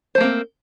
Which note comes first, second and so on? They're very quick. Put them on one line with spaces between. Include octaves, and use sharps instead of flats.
C5 A3 A#3 C4